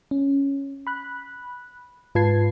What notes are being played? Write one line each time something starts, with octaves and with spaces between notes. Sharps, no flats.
C#4
B5 F#6
G#2 F4 B4 A5 G#6 C7